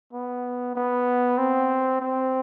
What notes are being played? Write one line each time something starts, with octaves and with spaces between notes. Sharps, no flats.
B3
B3
C4
C4